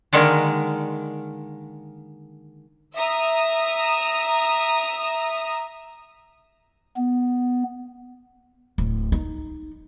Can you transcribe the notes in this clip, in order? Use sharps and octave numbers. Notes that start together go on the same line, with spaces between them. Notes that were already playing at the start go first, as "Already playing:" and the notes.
D3 D#3 G#3 A#3
E5 A#5 D#6
B3
D1
D#4